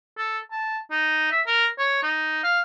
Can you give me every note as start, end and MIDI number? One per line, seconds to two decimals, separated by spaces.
0.18 0.39 69
0.52 0.78 81
0.91 1.29 63
1.31 1.41 76
1.47 1.67 70
1.79 2.01 73
2.03 2.41 63
2.44 2.61 77